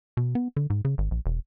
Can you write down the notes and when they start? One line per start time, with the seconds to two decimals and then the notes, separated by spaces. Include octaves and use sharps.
0.17 B2
0.35 B3
0.57 D3
0.70 G#2
0.85 C#3
0.98 G#1
1.11 A#1
1.26 E1